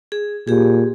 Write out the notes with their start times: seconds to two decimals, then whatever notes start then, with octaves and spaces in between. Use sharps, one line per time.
0.12 G#4
0.47 A#2 G4 G#4